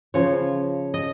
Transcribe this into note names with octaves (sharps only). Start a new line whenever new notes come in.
C#3 F3 C#5
D#5